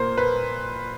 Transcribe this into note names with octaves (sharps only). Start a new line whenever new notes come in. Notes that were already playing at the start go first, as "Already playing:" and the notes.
Already playing: A#2 A#3 C5
A#3 B4